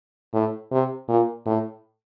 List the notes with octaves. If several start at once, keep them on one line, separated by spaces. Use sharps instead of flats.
A2
C3
A#2
A2